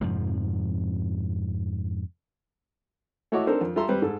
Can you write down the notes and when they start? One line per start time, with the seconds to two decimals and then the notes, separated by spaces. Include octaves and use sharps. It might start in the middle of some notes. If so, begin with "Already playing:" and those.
0.01 F2 G#2 C3 F3
3.32 A3 E4 F#4 C#5 D#5 D6
3.47 C4 D4 D#4 A4 A#4 C5
3.61 F2
3.76 G3 F4 A4 E5 A#5 C6
3.89 G3 C4 B4
4.02 G#2 G#4 A4